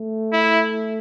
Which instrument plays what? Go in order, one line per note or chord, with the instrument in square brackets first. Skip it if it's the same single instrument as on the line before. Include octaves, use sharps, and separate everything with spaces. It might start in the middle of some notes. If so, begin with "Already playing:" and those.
Already playing: [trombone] A3
[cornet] E4